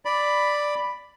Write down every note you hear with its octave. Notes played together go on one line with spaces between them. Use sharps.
D5 B5